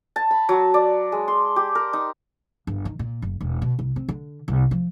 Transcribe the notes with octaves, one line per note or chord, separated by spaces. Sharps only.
A5
B5
F#3
D5
G#3
C6
G4
A#4
D#4
G1
D#3
A#2
F#1
E1
B2
C2
C4
D3
C2
F3